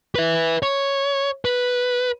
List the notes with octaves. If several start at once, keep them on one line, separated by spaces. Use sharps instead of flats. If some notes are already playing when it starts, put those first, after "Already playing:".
B4 E5
C#5
B4